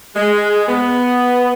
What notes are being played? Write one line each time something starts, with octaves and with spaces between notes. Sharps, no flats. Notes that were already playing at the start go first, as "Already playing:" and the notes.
G#3
B3